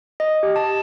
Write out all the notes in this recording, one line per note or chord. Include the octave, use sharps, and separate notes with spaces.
D#5
G4
A5